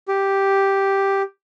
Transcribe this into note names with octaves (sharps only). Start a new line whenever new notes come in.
G4